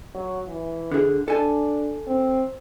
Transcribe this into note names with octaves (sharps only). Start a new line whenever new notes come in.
F#3
E3
D3 G#4
D4 A4 G#5 A5
C4